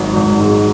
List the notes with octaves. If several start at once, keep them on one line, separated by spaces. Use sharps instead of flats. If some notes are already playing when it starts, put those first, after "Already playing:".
Already playing: G#1 F#3
G#1
G#2